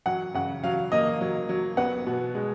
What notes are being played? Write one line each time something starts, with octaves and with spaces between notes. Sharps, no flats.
F#3 F#5
C#3 F#5
F#3 F5
A#3 D#5
F#3
F#3
B3 F#5
B2
G#3